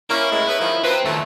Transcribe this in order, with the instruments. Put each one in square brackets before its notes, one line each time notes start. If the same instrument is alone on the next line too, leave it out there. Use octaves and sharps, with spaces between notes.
[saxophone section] A#3 C#4 [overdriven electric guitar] E4
[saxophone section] A2 G#3
B3 C#4 B4
D#3 F3
[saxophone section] F#2 F3 B4 [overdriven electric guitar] C4
[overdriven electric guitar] D#2 [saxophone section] A#2 F#3 A3